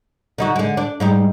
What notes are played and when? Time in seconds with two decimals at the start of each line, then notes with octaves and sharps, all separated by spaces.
0.38 D3 D#4 F#4
0.56 D3 G#3
0.77 D4
1.00 G#2 G3 D#4